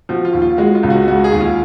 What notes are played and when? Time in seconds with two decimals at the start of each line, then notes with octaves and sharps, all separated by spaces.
0.09 F3 F#4
0.25 F4
0.33 D#2
0.42 F4
0.58 G#3 F#4
0.75 F4
0.83 C#2
0.90 F#4
1.07 G#3 F#4
1.24 G#4
1.32 D#2
1.41 F4